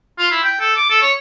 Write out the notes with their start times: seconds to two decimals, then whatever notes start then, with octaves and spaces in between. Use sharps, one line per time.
0.19 F4
0.31 E4
0.43 G5
0.60 A4
0.76 D6
0.90 A4
1.02 C#5